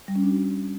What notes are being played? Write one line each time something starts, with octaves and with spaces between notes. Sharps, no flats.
G3
C#4
D4
F#4